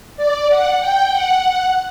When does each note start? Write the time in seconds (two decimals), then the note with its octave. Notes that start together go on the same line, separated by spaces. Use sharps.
0.17 D5
0.49 F#5
0.80 G5
1.11 F#5